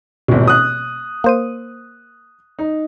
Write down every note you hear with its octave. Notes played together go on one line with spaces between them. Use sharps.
D#1 G#1 B2
D#6 F#6
A#3 C5 D#7
D#4